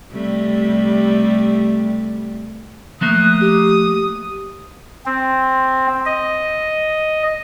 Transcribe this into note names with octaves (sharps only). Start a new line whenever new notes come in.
C3 G3 A3
F3 A3 A#3 D#6 F#6
G4
C4
D#5